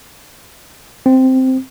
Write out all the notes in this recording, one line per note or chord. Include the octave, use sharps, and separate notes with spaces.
C4